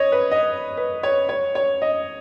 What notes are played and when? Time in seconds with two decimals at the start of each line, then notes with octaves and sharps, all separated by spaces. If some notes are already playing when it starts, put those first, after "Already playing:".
Already playing: C#5 D#5
0.12 B4
0.31 D#5
0.77 B4
1.03 C#5
1.29 C#5
1.55 C#5
1.82 D#5